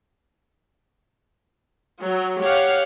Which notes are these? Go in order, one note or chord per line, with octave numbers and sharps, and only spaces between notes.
F#3
G4 C#5 F5 F#5